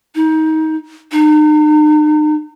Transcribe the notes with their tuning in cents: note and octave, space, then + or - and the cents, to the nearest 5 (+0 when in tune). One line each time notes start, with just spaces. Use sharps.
D#4 +25
D#4 -40